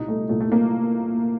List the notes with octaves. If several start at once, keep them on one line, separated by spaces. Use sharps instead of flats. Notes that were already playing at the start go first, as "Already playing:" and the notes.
Already playing: C2 A#2 D#4
A3
C2 A#2 A3
A3
A#3